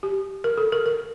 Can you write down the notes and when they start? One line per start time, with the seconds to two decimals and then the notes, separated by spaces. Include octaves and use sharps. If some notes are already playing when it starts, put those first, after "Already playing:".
0.03 G4
0.44 A#4
0.58 A4
0.72 A#4
0.86 A#4